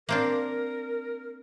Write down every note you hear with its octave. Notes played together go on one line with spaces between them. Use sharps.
A#3 C4 D4 A#4